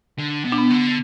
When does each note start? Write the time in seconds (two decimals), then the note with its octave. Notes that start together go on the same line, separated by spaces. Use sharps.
0.18 D3
0.45 B2
0.52 D4
0.58 B3
0.70 D3